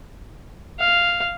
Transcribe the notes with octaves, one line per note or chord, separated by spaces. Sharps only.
F5